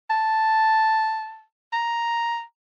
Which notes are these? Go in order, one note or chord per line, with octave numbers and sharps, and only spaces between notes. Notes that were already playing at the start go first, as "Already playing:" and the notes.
A5
A#5